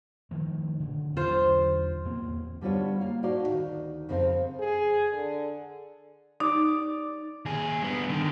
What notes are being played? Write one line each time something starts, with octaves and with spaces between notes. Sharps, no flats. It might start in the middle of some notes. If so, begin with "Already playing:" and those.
D#3 F3 A3
D1 D3
E2 D3 F#3 F4 C5
E2 A#3 C4
D3 G3 B3 F4 C#5
A#3 F5
A2 D#4 F#4 D5 D#5 F5
D2 D#3
F2 C#3 C4 A#4 C5 F5
G#4
D3
D#4 D5
D#2 G#4
G2 B3
D3 D#3